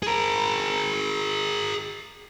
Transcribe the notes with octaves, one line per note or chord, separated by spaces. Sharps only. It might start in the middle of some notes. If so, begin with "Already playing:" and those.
G#4 A#4